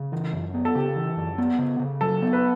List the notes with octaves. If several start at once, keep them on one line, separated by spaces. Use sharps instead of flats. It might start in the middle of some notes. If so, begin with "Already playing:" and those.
Already playing: C#3
E3
F#2
B3
A4
C#3 G4
E3
F#2
B3
C#3
C#3
F#3 A4
B3
B4